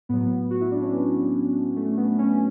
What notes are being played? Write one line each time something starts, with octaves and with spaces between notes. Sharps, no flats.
A2 F#3 B3
F#4
E4
D4
C#4
B3
A3
B3
C#4